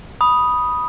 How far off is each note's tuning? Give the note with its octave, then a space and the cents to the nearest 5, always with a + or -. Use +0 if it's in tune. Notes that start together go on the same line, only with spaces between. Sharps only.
B5 -10 D#6 +0